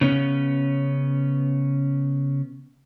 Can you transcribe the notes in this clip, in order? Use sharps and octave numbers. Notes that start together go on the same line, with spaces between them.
C#3 B3 C#4